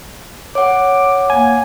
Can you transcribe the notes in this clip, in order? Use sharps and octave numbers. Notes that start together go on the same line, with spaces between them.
C#5 F#5 D6
A#3 G#5